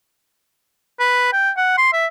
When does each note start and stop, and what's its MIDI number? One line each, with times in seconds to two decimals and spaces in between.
0.99 1.28 71
1.33 1.50 79
1.57 1.74 78
1.78 1.93 84
1.93 2.06 76